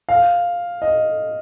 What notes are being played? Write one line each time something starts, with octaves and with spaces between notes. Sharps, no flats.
F5
D#5